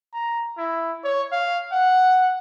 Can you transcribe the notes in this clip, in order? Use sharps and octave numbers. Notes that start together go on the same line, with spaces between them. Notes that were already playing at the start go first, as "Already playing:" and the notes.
A#5
E4
C#5
F5
F#5